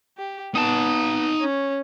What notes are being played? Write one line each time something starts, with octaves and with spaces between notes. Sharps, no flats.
G4
B3 D#4 A5
C#4